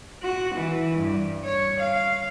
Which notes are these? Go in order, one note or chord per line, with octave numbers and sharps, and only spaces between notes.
F#4
E3
G2
C#5
F5